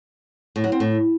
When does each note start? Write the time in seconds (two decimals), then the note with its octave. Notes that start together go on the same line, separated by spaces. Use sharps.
0.56 A2
0.64 F#3
0.72 C4
0.80 A2